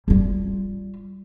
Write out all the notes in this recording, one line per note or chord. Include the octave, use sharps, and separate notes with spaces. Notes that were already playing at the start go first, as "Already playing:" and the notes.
G3 F4